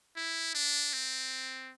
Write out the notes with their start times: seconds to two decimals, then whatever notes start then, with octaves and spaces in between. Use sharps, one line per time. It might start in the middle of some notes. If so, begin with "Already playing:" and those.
0.17 E4
0.55 D4
0.93 C4